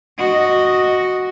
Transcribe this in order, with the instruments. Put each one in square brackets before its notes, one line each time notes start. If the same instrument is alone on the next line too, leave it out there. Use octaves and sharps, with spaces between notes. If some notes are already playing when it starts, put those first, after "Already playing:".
[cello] F#4 D#5